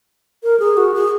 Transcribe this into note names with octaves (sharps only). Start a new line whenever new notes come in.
A#4
G#4
F#4
G#4